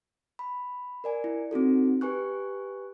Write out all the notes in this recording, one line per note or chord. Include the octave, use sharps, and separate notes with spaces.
B5
A#4 D5 G#5
E4
C4 D#4 F#4 A4
G4 B4 G#5 C#6 F#6